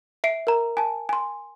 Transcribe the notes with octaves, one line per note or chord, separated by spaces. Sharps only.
E5 C7 D7
A#4 A#5
G#5 A5
G#5 C6